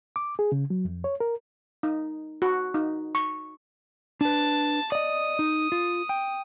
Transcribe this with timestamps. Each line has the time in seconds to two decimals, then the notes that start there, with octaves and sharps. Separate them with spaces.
0.16 D6
0.39 G#4
0.52 C#3
0.70 F#3
0.85 F2
1.04 C#5
1.20 A#4
1.83 D#4
2.42 F#4
2.74 D#4
3.15 C#6
4.21 D4 B4 A5
4.92 D5 D#5 D#6
5.39 D#4
5.72 F4
6.09 G5